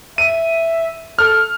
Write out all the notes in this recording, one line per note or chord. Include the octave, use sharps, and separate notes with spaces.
E5 D#7
A4 F6